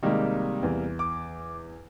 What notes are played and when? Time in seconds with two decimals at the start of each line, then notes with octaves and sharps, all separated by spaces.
0.03 C3 D#3 G3 G#3 A#3
0.63 E2
0.99 D6